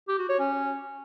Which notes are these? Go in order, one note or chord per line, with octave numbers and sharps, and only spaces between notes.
G4
F#4
C#5
C#4